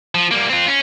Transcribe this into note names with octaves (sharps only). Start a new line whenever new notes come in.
F3
G3 A#3
C4 F4
C#4